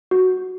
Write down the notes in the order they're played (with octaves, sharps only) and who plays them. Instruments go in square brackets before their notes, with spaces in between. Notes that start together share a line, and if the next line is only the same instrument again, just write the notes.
[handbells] F#4